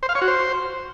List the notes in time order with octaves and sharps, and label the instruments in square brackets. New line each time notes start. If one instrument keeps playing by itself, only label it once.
[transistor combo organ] C5
F5
C#5
F#4
C5